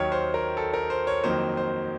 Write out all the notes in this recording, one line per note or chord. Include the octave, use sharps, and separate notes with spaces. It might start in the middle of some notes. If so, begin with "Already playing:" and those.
Already playing: D#2 D#3 F#3 C#5
C5
A#4
A4
A#4
C5
C#5
F2 D#3 F#3 A#3 C5
C5